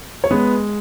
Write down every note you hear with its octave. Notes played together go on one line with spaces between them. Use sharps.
C#5
G#3 B3 B4